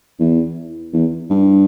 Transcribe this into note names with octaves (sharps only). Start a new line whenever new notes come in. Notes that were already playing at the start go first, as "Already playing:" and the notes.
E2
E2
G2